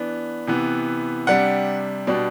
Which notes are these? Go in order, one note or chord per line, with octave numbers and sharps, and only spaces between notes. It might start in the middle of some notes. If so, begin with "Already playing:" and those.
Already playing: E3 B3 D4
C3 E3 B3
C3 G3 D4 F#5
B2 G3 D4